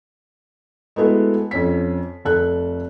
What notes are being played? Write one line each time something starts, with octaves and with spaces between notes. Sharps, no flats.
G#3 A3 B3 E4 F#4
F2 C#4 B6
F1 A4 F#6